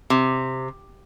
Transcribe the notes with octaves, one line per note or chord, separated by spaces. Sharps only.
C3